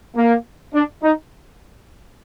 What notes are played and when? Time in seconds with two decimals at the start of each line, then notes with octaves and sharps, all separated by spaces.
0.16 A#3
0.73 D4
1.03 D#4